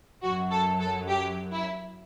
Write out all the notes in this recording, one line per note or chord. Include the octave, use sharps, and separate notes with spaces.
F#2 F#3 F#4
A4
A4
G4
E4